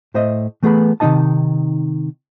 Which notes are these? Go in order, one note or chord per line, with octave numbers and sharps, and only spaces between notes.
A2 C5 D#5 E5
E3 A3 B3 G#4 B4 B5
C3 D#3 D4 D#4 D#5 A5